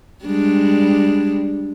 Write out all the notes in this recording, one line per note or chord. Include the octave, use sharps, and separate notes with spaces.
G3 G#3 D4